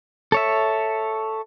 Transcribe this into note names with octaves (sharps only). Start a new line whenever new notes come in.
A4 C#5 E5